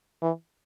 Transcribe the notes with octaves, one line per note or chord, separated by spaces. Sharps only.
E3